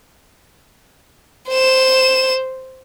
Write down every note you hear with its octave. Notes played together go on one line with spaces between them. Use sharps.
C5 E7